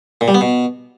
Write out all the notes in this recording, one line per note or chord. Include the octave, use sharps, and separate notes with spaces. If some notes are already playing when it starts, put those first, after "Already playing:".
A#2
G3
B3
B2